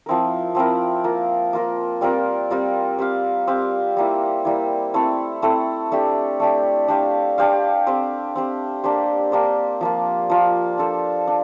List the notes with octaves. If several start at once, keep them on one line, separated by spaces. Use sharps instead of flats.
F3 C4 E4 A#4
F3 C4 E4 A#4
A#3 F4 A#4
A#3 F4 A#4
G3 C4 F4 A#4
G3 C4 F4 A#4
C4 G4 C5 F5
C4 G4 C5 F5
G3 A#3 E4
G3 A#3 E4
A3 C4 E4 A4
A3 C4 E4 A4
A3 D4 G4
A3 D4 G4
D4 G4 C5 F5
D4 G4 C5 F5
C4 G4 C5
C4 G4 C5
A#3 D4 G4 C5
A#3 D4 G4 C5
F3 A#3 F4
F3 A#3 F4
D4 A4 C5
D4